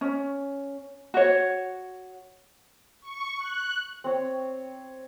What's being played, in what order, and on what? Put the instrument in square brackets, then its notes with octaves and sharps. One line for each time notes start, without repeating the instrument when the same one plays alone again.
[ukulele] C#4
F#4 C#5
[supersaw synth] C#6
F#6
[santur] C4 C#5